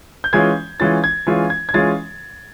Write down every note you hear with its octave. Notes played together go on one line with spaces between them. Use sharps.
G6
E3 G#3 C#4 F4 G#6
E3 G#3 C#4 F4 A6
G#6
E3 G#3 C#4 F4
G#6
G#6
E3 G#3 C#4 F4 A6